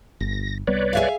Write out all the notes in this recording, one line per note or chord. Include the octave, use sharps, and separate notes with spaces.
G1 A#6
C2 G3 B3 B4 C#5 D5
G#4 E5 F5